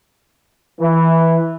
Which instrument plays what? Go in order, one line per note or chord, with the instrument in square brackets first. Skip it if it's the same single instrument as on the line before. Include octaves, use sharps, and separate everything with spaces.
[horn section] E3